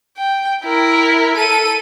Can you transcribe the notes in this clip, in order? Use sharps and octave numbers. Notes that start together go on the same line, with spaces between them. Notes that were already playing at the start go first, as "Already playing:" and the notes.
G5
E4 A#4
A4 D#7